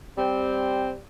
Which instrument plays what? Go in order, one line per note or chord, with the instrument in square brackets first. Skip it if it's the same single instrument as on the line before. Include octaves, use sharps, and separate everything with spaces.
[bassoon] G3 [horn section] C4